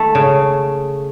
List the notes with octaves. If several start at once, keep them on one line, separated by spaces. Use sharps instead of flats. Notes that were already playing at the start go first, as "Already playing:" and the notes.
Already playing: A3 A4
C#3